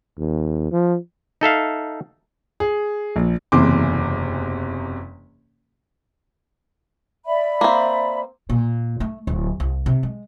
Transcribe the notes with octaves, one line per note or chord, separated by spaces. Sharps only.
D#2
F3
D#4 A4 E5 F5
G#4
A#1
F#1 E2 C3 E3 C6 D6
D5 E5 B5
A#3 C4
A#2
A3
D1
C2
C3
G#3